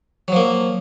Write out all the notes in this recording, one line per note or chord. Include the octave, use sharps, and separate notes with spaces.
F3 F#3 A#3